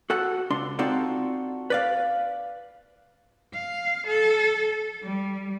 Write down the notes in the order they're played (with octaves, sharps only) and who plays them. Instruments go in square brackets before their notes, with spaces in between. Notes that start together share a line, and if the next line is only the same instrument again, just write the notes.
[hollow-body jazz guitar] F#4 A4 F#5
C#2 D4 C6
C4 D#4 F4 F#4 A4 D5
B4 D5 F5
[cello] F5
A4
G3